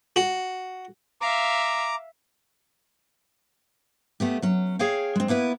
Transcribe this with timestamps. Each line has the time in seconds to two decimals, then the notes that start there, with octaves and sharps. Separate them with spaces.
0.16 F#4
1.21 E5 F5 A#5 D6
4.20 A3 B3 G4
4.42 F#3 C#4
4.79 G#4 C#5 F5 G5
5.16 G#3 C4
5.28 A#3 B3 E4 B4